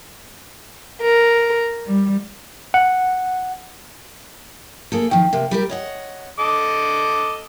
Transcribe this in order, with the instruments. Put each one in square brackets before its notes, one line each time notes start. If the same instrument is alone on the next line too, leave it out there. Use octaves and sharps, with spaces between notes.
[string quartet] A#4
G3
[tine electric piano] F#5
[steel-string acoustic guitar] A#3 G#4 A4
[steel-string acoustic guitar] D#3 F3 [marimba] G5
[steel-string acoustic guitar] C3 A#3
G3 G4 A#4
C#5 D#5 F#5
[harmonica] A4 D#5 D6